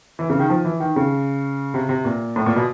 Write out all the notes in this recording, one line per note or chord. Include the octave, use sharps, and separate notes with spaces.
E3
C#3
D#3
F3
E3
D#3
C#3
C3
C3
A#2
A2
A#2
B2